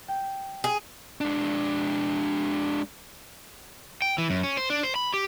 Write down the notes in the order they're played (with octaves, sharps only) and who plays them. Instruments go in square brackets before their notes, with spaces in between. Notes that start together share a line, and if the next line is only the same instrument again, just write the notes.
[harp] G5
[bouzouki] G#4
[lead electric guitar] G#3 D4
[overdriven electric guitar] G5
E3
F#2
C#4
C5
D4
C5
B5
G4